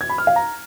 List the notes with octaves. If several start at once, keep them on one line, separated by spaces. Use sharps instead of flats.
G#6
B5
F6
F5
A#5